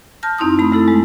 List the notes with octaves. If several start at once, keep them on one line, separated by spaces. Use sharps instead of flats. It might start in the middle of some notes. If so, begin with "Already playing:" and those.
A5 F6 G6 A#6
F#2 C4 D#4 E4 C6 D#6
A3 B5
A3 E4 A4 A6
G#3